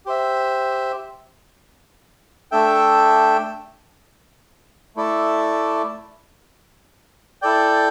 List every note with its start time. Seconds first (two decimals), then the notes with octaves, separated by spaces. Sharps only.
0.06 G4 C5 E5
2.51 A3 D4 A4 E5 G5
4.96 A3 E4 A4 D5
7.42 E4 A4 D5 G5